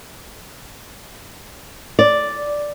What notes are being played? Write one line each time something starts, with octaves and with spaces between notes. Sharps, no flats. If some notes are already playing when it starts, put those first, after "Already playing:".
D5